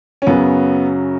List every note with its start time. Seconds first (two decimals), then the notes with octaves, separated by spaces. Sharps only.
0.22 C#4
0.27 F#2 C#3 F#3 B3